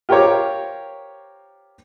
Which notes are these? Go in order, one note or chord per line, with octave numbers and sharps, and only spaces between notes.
F4 G4 A#4 C5 C#5 D6